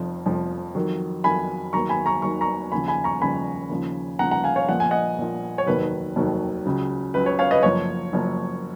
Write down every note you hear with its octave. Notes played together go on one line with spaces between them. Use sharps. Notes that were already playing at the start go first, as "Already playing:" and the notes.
Already playing: F1 F2 F3
F1 F2 F3
F2 D#3 F#3
F2 D#3 F#3 G#5 B5
D#2 D#3 F#3 A#5 C#6
G#5 B5
A#5 C#6
D#2 D#3 F#3 C#6
A#5 C#6
D#2 C#3 F3 G#5 B5
G#5 B5
A#5 C#6
D#2 C#3 F3 G#5 B5
D#2 C#3 F3
D#2 C#3 F3 F#5 A#5
F#5 A#5
F5 G#5
C#5 F5
A#1 A#2 F3 F#5
G#5
D#5 F#5
A#1 A#2 F3
C#5
F1 D#2 D#3 F#3 B4
F1 D#2 D#3 F#3
C#2 C#3 F#3
C#2 C#3 F#3 B4
C#5
C#5 F5
B4 D#5
F#1 F#2 F3 C#5
F#1 F#2 F3